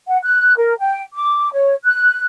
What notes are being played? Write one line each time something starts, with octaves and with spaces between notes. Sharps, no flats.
F#5
F#6
A#4
G5
D6
C#5
F#6